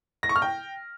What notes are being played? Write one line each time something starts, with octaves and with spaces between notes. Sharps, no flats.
A#6
C#6
F6
G5